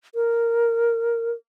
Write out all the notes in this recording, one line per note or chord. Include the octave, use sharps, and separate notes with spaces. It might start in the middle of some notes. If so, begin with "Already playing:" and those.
A#4